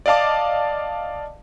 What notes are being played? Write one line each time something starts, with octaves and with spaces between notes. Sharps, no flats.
D5 D#5 F5 A5 D6